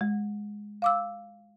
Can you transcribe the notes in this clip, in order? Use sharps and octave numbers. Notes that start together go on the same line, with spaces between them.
G#3
F5 D6 E6